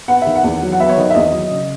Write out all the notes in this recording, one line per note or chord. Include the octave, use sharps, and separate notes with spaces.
B3 F#5
D#3 E5
F#5
E2
F#3
F#5
B3 E5
C#5
D#3 D#5
E5
E2 D#5
F#3
C#3